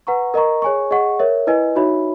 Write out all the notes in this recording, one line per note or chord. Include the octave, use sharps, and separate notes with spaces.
B4 F#5 A#5 C#6
A#4 D#5 A#5 C#6
G#4 C#5 G#5 C#6
G#4 D#5 F#5 C#6
A#4 C#5 E5
E4 B4 D#5 G#5
D#4 F#4 C#5 E5 B5